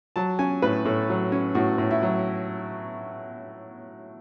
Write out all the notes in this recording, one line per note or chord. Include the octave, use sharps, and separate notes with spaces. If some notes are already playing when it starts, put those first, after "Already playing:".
F#3 A5
C#4 G#5
A2 B4
A2 A4
F#3
C#4
A2 F#4
A2
E4
F#3